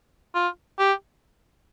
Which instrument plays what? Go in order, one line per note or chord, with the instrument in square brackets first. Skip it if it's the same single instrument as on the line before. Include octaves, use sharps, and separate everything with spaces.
[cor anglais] F4
G4